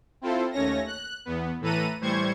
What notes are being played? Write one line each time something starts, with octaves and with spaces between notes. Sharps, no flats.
C4 E4 F4 A4 C5
D#2 A3 C#4 C#5 A#6
F#6
E2 B3
A2 E3 A4 B4 A#5 D#7
A2 E3 G3 C5 C#6 G#6